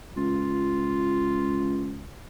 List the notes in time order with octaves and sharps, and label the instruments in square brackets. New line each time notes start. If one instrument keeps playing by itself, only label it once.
[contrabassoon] C#2 [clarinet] F4